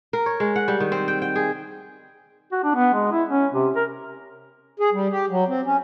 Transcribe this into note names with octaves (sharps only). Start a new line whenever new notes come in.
A#4
C#5
G#3
F#5
G3
D#3
C4
G5
G5
G#4
F#4
D4
B3
G#3
E4
C#4
C3
A#4
G#4
G3
G4
F#3
C4
C#4